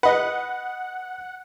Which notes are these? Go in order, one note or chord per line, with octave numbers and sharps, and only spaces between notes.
B4 D#5 F#5